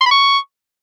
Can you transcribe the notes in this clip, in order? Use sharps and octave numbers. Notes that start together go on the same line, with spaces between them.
C6
B5
C#6